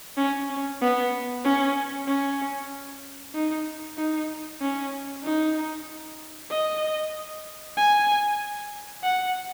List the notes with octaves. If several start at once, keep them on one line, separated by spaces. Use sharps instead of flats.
C#4
C#4
B3
C#4
C#4
D#4
D#4
C#4
D#4
D#5
G#5
F#5